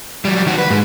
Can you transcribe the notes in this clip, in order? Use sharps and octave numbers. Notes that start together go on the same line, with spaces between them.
F#3 G3
D#3 F#4
B4
G#2 G#3